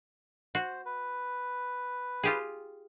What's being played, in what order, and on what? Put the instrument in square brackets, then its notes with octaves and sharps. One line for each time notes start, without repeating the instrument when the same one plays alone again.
[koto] F#4 [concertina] C5
[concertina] B4
[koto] F4 G4 G#4